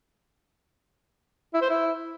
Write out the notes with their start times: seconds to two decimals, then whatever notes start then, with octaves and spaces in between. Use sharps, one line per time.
1.54 E4
1.62 C5
1.69 E4